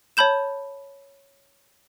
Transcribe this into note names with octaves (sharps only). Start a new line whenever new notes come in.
C#5 A5 B5 G6 E7